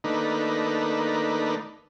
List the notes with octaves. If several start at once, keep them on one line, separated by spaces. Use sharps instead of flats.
D#3 A3 A#3 D4 D#4 B4